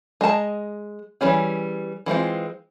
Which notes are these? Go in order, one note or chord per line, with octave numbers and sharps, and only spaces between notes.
G#3 D#5 A5 A#5
E3 G3 C#4 G#4
E3 G#3 C4 F4